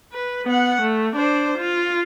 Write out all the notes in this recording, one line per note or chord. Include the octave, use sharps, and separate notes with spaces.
B4
B3 F#5
A3
D4 C5
F4